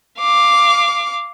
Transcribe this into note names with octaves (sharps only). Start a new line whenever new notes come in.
F5 D6